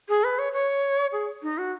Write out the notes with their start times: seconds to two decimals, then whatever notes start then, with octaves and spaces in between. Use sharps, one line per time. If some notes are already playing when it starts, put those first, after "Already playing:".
0.09 G#4
0.24 B4
0.39 C#5
0.53 C#5
1.12 G#4
1.43 D#4
1.58 F#4